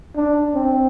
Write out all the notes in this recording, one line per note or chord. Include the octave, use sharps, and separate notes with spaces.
D4
C4